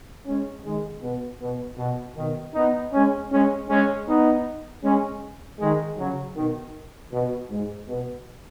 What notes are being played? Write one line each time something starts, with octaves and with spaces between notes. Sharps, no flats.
G#3 C#4
D#3 G#3
B2
B2
B2
B2 D#3
B3 D#4
G#3 C#4
G#3 C#4
G#3 C#4
B3 D#4
G#3 C#4
D#3 G#3
C#3 F#3
B2 D#3
B2
G#2
B2